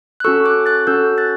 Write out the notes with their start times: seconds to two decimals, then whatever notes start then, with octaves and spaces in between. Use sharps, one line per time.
0.20 F#6
0.24 C#4 F#4 A4 C#6 E6
0.45 D6 F#6
0.66 F#6 A6
0.87 C#4 F#4 A4 E6 G6
1.18 F#6 A6